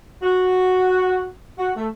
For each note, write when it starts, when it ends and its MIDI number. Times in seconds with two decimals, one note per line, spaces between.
0.23 1.24 66
1.59 1.72 66
1.77 1.88 57